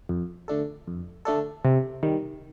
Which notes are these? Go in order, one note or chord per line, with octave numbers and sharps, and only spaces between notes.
F2
D3 A3 D4 A4
F2
D3 A3 D4 A4
C3
D#3 G3